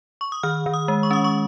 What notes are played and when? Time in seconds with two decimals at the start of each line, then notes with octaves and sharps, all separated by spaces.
0.21 C#6
0.32 D#6
0.43 D#3 F6
0.66 D#3
0.74 D#6
0.88 G#3
1.03 C#6
1.11 C#4 D#6
1.24 C#6